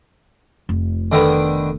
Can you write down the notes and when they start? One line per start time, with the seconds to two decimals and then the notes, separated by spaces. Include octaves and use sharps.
0.69 F1
1.12 D3 D#3 B3